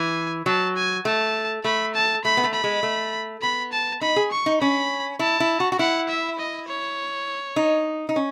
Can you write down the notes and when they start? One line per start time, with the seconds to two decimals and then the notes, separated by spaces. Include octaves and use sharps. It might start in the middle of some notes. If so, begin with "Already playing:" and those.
Already playing: E3 G#5
0.46 F#3 A5
0.76 G#5
1.05 A3 A5
1.64 A3 B5
1.95 A5
2.24 A3 B5
2.37 B3
2.44 A3
2.54 B5
2.64 G#3
2.83 A3
3.42 B3 B5
3.72 A5
4.01 D#4 B5
4.16 G#4
4.32 C#6
4.46 D#4
4.60 C#4 B5
5.19 E4 A5
5.40 E4
5.60 F#4
5.72 F#4
5.79 E4 F#5
6.09 E5
6.39 D#5
6.68 C#5
7.56 D#4
8.09 D#4
8.16 C#4